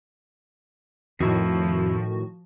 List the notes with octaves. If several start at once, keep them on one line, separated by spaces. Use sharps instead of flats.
F2 A2 D#3 F3 E4 F#4